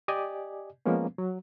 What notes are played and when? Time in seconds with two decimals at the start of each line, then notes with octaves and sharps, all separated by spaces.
0.08 G4 D5 D#5 G#5
0.86 F3 G#3 A#3 B3 C#4
1.18 F#3